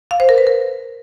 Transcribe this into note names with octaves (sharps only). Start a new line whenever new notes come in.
F5
C5
A#4
B4
A#4